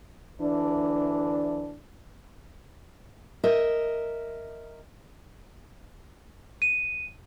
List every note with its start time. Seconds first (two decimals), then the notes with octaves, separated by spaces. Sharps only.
0.41 D2 E3 D4
3.44 A#4 D#5 E5
6.62 D#7